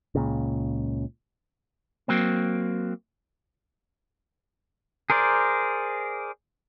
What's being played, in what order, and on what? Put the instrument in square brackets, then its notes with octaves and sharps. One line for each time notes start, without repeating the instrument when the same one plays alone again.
[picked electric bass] C#2 A#2 C#3
[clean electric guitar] F#3 A#3 C4
[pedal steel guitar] G#4 A#4 C5 D5